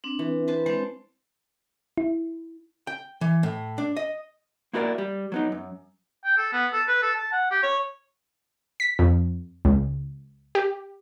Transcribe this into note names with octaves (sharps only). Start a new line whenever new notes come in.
C4 D4
E3
B4 C5 A5
G#3 C4 D4 C5 D5
E4
G5
E3
A2
D4
D#5
A#3 E4 F#4 A#4 C5 D5
G3
F#3 B3 D#4
F#2
G5
A4
B3
A4
B4
A4
A5
F#5
G4
C#5
B6
F2
C#2
G4